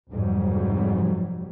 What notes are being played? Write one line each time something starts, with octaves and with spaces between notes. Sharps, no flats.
F1 F2 G#2 F#3 G3